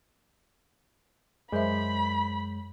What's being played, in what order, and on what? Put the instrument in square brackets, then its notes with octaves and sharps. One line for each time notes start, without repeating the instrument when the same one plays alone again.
[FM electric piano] F#2 [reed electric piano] G#3 G6 [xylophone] A#4 C5 E5 [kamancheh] B5